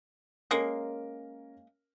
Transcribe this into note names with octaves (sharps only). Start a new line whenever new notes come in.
G#3 A#3 C#4 A#4